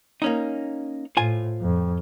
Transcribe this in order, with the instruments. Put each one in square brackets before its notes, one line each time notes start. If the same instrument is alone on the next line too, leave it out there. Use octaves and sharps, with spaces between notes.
[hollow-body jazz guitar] A#3 C#4 D#4
[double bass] A2 [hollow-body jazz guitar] F4 C5 G#5
[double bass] F2